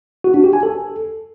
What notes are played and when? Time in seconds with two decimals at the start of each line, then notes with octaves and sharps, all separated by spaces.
0.24 F#4
0.34 D4
0.44 G4
0.53 G#5
0.63 A4